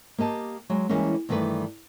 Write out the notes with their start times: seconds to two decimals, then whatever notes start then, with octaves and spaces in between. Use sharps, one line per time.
0.18 A#3 G4 D#5 A5
0.70 F#3 G#3
0.89 E3 G3 G#3 A#3 C#4
1.29 G2 D#3 E3 A3 B4 D5